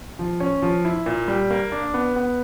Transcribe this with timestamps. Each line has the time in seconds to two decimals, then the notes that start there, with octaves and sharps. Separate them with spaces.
0.19 F3
0.40 C#4
0.62 F3
0.85 E4
1.06 A#2
1.28 G3
1.51 A#3
1.72 D4
1.94 B3
2.16 B3